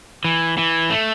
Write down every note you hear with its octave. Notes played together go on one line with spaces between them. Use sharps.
E3
E3
A3